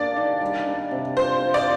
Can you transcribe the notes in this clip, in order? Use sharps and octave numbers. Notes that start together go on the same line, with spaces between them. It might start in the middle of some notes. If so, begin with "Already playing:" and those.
Already playing: A#3 D4 D5
D#3
G3
D4
C3
F4 C5
F4
D5